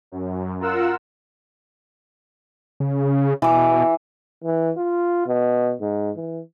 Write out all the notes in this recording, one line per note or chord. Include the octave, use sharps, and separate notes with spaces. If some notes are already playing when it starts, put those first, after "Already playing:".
F#2
F4 A#4 F#5 E6
C#3
B2 E3 D6
E3
F4
B2
G#2
E3